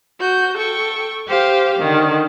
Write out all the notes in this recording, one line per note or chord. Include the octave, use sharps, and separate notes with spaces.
F#4 G6
A4 G5 C#6
G4 C5 F5 G5
D3 D#3